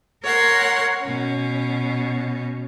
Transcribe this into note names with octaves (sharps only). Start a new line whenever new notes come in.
A#4 C#5 F#5 C6
B2 C#4